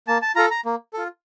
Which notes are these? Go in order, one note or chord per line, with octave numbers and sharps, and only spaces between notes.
A#3 A5
A5
F4 A4 A#5
A#5
A#3
F4 A4